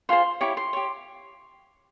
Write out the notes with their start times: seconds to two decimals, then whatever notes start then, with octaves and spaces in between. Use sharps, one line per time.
0.09 F4 G#4 C5 C6
0.41 E4 G4 C#5 C#6
0.57 C6
0.73 G4 C#5